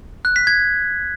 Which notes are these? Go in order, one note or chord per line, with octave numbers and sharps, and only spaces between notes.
F#6
B6
G#6